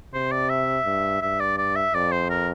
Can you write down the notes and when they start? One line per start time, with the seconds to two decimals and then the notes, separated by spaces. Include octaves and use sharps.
0.13 C3 C5
0.32 D5
0.49 E5
0.85 G2
1.21 G2 E5
1.40 D5
1.58 D5
1.75 E5
1.94 F2 D5
2.12 C5
2.30 A#4